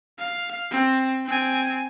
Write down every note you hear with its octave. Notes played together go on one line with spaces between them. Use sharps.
F5
C4
C4 G#5